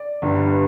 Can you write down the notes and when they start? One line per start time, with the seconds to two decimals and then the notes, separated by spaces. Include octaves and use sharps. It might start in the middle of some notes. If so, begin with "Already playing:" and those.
Already playing: D5
0.22 G1 G2 D3 G3 D4
0.51 B4